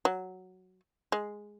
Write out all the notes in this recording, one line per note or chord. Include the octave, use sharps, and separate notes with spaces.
F#3
G#3